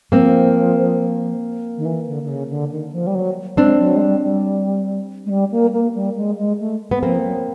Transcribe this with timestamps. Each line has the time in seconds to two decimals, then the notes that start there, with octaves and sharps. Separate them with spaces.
0.12 F3 A#3 C4
1.77 D#3
1.85 E3
2.07 D3
2.23 D3
2.28 C#3
2.49 D3
2.71 D#3
2.92 F3
3.07 G3
3.15 F#3
3.57 G#3 C4 D4
3.79 F#3
3.96 G#3
4.01 G3
4.23 G3
5.26 G#3
5.29 G3
5.51 A#3
5.73 A#3
5.95 G3
6.16 G#3
6.38 G#3
6.60 A3
6.91 B3
7.03 F3 A#3 C4
7.24 F#3